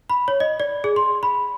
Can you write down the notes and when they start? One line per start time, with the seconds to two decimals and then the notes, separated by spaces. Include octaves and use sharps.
0.10 B5
0.28 C#5
0.40 D#5
0.60 D5
0.84 G#4
0.96 C6
1.23 B5